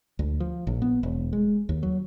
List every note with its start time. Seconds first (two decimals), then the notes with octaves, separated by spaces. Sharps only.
0.19 D2
0.40 F3
0.67 A#1
0.82 B3
1.03 E1
1.33 G#3
1.69 D#2
1.83 F#3